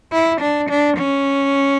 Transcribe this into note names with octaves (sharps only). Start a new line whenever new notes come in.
E4
D4
D4
C#4